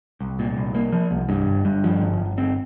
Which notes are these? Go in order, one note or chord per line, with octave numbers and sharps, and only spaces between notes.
C2
A#2
C2
A#3
F3
C2
G2
G1
G2
F3
G1
G1
C4